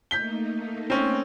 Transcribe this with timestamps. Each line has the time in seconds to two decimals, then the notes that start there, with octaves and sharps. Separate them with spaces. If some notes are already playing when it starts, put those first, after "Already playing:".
0.11 A3 A#3 D#4 G6 B6 G7
0.90 C4 C#4